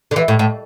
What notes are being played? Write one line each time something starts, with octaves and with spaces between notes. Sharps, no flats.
D3
E3
A2
A2